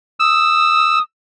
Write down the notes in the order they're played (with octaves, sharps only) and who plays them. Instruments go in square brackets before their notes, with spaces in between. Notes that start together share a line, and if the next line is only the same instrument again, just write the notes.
[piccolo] D#6 [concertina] E6